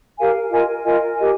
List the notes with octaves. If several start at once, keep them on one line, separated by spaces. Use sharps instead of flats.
G4 A#4 F5 G#5
F4 A#4 D#5 G#5
F4 A#4 D#5 G#5
G4 A#4 D#5 G#5